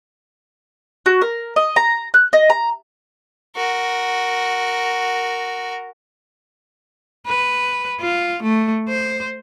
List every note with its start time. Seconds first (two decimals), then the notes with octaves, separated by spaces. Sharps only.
1.06 F#4
1.22 A#4
1.56 D#5
1.76 A#5
2.14 F#6
2.33 D#5
2.50 A#5
3.56 F#4 A#4
7.27 B4
8.01 F4
8.43 A3
8.89 C5